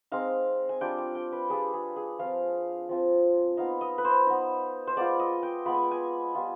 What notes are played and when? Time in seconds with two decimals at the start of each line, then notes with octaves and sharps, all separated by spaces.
0.12 G#3 C4 D#4 F5
0.69 G#5
0.81 G3 D4 F4 G5
0.98 G5
1.15 G5
1.32 B4
1.50 G3 D4 F4 G#4
1.74 G#4
1.96 G#4
2.19 F3 C4 F4 F5
2.89 F3 C4 F4
3.57 B3 D#4 F5
3.81 D#5
3.98 B4
4.05 C5
4.26 B3 D#4
4.87 C5
4.96 G#3 B3 F4 D5
5.20 D#5
5.43 G5
5.66 G#3 B3 F4 B5
5.74 G#5
5.83 G5
5.91 G#5
6.35 G3 B3 F4